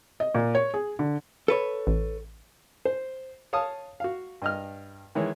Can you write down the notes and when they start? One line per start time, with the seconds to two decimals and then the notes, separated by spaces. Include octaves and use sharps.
0.20 D#5
0.35 A#2
0.55 C#5
0.74 G#4
0.99 D3
1.48 A4 B4 C#5
1.87 A1
2.85 C5
3.53 C#5 F5 A5 D#6
4.00 F#4 F5
4.42 G2 D#5 F6
5.15 D#3 E3 G#3 C#5